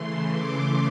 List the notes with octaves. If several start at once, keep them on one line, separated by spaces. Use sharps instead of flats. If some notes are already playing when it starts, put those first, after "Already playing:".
Already playing: C#3 E3 A3 C6
D6